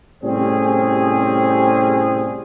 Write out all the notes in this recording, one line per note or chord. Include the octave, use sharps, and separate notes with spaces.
A2 C3 G3 C4 C#4 G#4